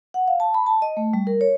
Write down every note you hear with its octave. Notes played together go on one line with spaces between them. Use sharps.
F#5
F5
A5
B5
A5
D#5
A3
G3
A#4
C#5